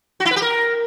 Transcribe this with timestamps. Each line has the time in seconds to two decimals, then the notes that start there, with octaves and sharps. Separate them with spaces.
0.20 F#4
0.25 E4
0.31 B4
0.36 G4
0.42 A#4